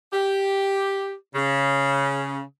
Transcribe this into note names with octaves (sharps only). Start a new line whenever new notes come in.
G4
C#3